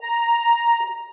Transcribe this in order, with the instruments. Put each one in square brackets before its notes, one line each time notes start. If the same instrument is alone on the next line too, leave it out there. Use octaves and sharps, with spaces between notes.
[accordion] A#5